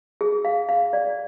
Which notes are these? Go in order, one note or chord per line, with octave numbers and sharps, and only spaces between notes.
G#4
F5
F5
D5